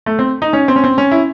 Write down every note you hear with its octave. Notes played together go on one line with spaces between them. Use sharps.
A3
C4
D#4
C#4
C4
C#4
C4
C#4
E4